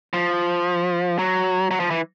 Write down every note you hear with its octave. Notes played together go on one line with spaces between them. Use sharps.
F3
F#3
F#3
F3
E3